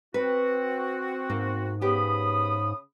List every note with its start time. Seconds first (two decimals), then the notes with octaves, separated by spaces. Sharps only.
0.14 C4 F#4 B4
1.30 G#2 A#3
1.81 C#3 B3 G4 B5 D#6